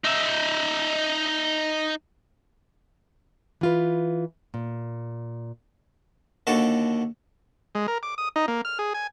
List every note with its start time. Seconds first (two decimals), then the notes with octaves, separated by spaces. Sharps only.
0.04 D#4 E5
3.61 E3 F4 B4
4.54 A#2
6.47 D#2 D3 F#4 A4
7.75 G#3
7.88 A#4
8.03 D6
8.18 D#6
8.36 D#4
8.48 A#3
8.65 F6
8.79 G#4
8.94 G#5